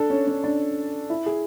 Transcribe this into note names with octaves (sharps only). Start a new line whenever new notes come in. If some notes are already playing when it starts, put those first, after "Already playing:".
Already playing: D4 A4
C#4
C#4
D4
E4
G#4